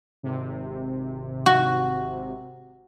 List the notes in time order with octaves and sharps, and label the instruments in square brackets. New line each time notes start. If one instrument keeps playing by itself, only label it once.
[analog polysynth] G#1 C3
[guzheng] F#4